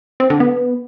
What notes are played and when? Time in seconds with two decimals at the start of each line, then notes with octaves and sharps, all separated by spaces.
0.20 C4
0.30 D3
0.40 B3